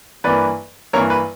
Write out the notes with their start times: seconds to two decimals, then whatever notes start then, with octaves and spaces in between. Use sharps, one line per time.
0.24 G2 E3 A#3 B4 D5
0.93 G2 E3 A#3 A#4 C#5
1.10 B4